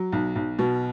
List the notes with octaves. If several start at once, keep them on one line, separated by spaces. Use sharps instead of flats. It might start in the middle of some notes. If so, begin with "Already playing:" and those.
Already playing: F#3
B1
B1
B2